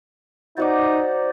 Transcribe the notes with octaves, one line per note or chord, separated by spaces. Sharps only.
D#4 F#4 C5 D5 F#5 D6